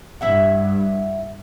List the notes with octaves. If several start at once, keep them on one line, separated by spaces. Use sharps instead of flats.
G2 E4 E5 F#5